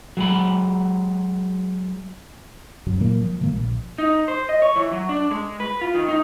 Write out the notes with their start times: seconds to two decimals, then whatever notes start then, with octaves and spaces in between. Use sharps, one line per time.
0.17 F#3 G#3 B5
2.86 F#2 C#3 F#3
3.00 A#2 E3 F#3 A#3
3.22 F3
3.41 C3 D#3 G#3 A#3
3.53 A#1
3.98 D#4
4.28 C5
4.49 D#5
4.62 C#5
4.76 E3
4.92 F#3
5.09 D4
5.31 G#3
5.60 B4
5.81 F4
5.95 D#3
6.08 D#4